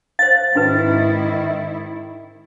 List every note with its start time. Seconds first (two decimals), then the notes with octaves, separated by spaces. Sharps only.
0.19 C5 F5 A6
0.55 G#2 D#3 C#4 E4 F#4 B4